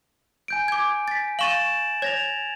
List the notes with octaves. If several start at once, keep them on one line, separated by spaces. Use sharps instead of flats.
G#5 G6 D7
D6 G#6
A6 B6
F5 C#6 A6 D#7 E7 F#7
C#5 G#6 A#6 F7